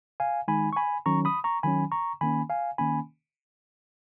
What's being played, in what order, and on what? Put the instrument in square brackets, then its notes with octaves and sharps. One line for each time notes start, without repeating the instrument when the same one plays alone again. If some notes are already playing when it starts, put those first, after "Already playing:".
[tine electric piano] F5 G#5
D#3 G#3 D#4 G#5 B5
C#6
G#5 B5
D#3 F#3 C#4 A#5 C#6
B5 D#6
A#5 C#6
D#3 F#3 C#4 G#5 B5
A#5 C#6
D#3 A#3 C#4 G#5 B5
F5 G#5
D#3 A#3 C#4 G#5 B5